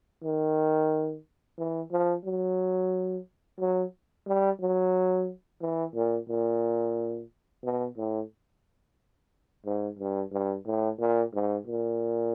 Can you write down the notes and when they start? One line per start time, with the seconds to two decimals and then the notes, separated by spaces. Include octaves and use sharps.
0.24 D#3
1.58 E3
1.91 F3
2.25 F#3
3.60 F#3
4.27 G3
4.61 F#3
5.61 E3
5.95 A#2
6.29 A#2
7.64 B2
7.97 A2
9.65 G#2
9.99 G2
10.32 G2
10.66 A2
10.99 A#2
11.34 G#2
11.67 A#2